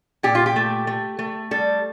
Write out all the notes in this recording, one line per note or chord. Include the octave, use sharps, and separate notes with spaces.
A#2 G4
F4
G4
A3
A3
A3
G3 A4